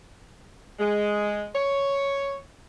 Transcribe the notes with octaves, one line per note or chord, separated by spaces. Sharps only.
G#3
C#5